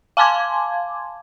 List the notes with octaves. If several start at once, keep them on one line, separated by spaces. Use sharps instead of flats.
F5 G#5 A5 C6 D6 G#6